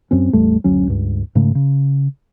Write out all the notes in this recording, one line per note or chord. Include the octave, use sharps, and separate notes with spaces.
F#2 C4 C#4
A1 E2 G3 A3
F#1 D2 F#3 C#4
C#2 G2
G#2 C#3 A3
C#3